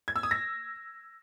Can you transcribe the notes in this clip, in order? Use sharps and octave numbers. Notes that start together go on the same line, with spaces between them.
G#6
E6
D#6
A#6